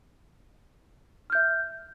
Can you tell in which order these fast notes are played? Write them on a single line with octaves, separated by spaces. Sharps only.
F6 G6 E5